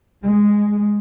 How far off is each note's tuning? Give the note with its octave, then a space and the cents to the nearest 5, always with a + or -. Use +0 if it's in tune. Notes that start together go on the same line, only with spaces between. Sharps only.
G#3 -5